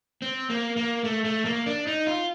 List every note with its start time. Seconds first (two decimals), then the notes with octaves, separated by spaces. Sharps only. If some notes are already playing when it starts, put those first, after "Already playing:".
0.22 C4
0.50 A#3
0.77 A#3
1.04 A3
1.25 A3
1.45 A#3
1.66 D4
1.87 D#4
2.07 F4